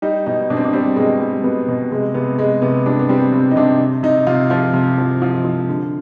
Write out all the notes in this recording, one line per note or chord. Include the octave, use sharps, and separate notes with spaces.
G3 D#4
B2 D#4
B2 D4
C4
D4
G3 C4
B2 G#3
G3
B2 B3
B2
C3 G#3
C3 B3
C3 G#3
C3 B3
G3 D4
B3
G3 C4
C3
D#4
C3 D4
C3
C3 D#4
C3 F4
F3 F4
C3
F3
F3
F3
D3